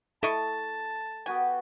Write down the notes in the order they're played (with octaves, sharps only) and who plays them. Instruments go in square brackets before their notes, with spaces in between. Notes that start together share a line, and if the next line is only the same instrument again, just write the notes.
[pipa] E4 D#5 C#6 [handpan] A4 [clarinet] A5
[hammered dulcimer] B3 F#4 G4 [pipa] G#5